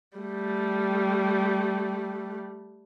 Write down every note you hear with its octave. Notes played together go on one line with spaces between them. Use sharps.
G3 A3